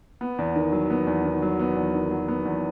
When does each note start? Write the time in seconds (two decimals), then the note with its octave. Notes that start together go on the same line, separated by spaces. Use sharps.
0.21 B3
0.39 E2
0.56 D#3
0.72 F#3
0.90 B3
1.07 E2
1.25 D#3
1.42 F#3
1.59 B3
1.76 E2
1.94 D#3
2.11 F#3
2.28 B3
2.45 E2